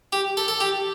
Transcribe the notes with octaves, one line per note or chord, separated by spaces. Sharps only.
G4
A4
A4
G4